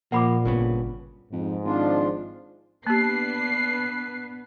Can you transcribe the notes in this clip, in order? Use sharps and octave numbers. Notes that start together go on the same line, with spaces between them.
A#2 F3 A#3 F#5 B5 D6
G#1 G2 C#3 B3
F2 G#2
G#1 F3 D4 F4
A#3 B3 D4 G4 B4 C7